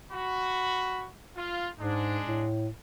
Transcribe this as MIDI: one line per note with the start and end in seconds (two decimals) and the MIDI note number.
0.12 1.06 66
0.12 1.06 83
1.37 1.68 65
1.79 2.20 44
1.79 2.48 56
1.79 2.48 62
2.26 2.68 45